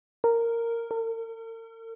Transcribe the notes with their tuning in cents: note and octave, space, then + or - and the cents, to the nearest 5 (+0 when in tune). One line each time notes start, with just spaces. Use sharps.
A#4 -10
A#4 -45